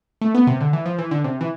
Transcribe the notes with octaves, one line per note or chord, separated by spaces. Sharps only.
A3
B3
C3
D3
E3
F3
E3
D3
C3
E3